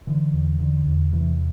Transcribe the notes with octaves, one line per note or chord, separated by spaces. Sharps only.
D3 E3
E2
D3
E2
C3 E3